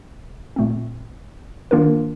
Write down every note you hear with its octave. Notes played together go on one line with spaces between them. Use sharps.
A#2 A3 C4
D#3 A#3 D4 F4 A#4